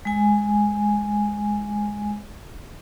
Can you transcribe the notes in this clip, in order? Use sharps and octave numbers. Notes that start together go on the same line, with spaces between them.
G#3 G#5